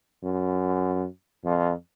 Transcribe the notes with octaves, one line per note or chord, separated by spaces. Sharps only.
F#2
F2